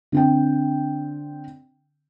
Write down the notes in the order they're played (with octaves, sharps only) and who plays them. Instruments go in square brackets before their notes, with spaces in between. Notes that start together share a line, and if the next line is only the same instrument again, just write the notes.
[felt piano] D3 C4 G5